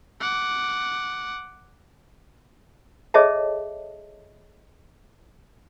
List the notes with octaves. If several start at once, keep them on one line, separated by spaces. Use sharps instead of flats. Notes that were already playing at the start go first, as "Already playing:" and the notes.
F#5 D6
G#4 A4 C#5 D#5 E5 A5